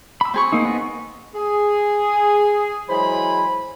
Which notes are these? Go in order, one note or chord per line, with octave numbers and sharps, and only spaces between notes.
B5 E6
C4 G#4 C#6
A#3 D#4
B3 D#5
G#4
E3 F#3 G#3 C5 G#5 B5